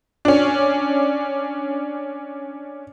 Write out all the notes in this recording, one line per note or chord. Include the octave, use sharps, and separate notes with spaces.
C#4 D4